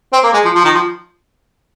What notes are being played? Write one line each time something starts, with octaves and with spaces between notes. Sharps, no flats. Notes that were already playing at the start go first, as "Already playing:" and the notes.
C4
A#3
G#3
F3
F3
D#3
F3